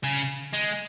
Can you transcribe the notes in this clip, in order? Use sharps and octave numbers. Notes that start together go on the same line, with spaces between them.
C#3
G#3